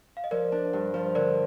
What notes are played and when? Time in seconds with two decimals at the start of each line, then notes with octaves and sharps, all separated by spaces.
0.17 F5
0.24 D#5
0.31 F3 A#4 D5
0.52 D4
0.73 G2
0.94 F3
1.15 D3 A#4 D5